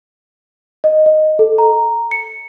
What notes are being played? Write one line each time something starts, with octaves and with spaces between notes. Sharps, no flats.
D#5
D#5
A4
A#5
C#7